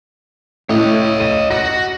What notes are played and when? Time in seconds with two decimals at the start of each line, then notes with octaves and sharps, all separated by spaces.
0.69 A2 C#5 D#5
1.20 D#7
1.51 F#4 A#6